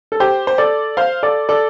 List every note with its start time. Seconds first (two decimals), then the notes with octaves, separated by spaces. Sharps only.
0.12 A4
0.20 G4 C5
0.47 C5
0.58 A4 D5
0.97 C5 F5
1.23 A4 D5
1.49 A4 D5